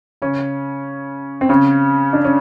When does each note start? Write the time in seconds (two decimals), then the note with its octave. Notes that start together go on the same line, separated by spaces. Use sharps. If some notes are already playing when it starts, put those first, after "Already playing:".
0.22 C#3 C#4
1.41 C4
1.49 C#3 C#4
2.13 D4
2.24 C#4